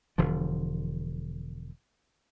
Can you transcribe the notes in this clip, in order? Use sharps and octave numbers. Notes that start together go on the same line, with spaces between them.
E1 D3 F3